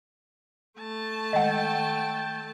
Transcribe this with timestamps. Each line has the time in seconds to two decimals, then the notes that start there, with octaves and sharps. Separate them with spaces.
0.78 A3 A5
1.33 D#3 G#3 D#5 F#5 G5